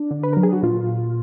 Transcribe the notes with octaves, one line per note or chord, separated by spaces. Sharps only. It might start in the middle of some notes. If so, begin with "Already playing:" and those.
Already playing: D4
D3
B4
F#3 A#4
G#4
F#4
A#2 F4